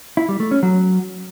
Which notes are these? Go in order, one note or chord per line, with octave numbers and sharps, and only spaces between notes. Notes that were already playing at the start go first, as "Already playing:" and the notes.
E4
G3
A3
C#4
F#3